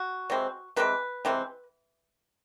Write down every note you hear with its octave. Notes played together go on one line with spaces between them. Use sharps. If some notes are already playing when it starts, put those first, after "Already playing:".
Already playing: F#4
C3 E3 G#3 C4
C3 E3 G#3 C4 B4
C3 E3 G#3 C4